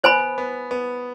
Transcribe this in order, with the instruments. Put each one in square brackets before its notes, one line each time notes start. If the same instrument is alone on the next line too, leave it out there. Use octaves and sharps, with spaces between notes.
[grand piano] B3 [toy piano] C5 G#5 B5
[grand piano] B3
B3